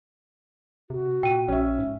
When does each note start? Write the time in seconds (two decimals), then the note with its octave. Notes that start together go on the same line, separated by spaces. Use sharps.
0.90 C3 F#4
1.23 A#2 G5 D#7
1.48 A#1 C#4 E5
1.78 G#2